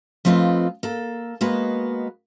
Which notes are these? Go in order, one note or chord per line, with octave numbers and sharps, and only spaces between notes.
F3 A3 C4 F4 B4 D#5
A#3 A4
G#3 A#3 B3 F#4 B4 D#5